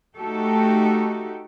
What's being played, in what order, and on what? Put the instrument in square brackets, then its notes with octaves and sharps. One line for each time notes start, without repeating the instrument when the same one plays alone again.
[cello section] A3 D#4 F#4 G4 A4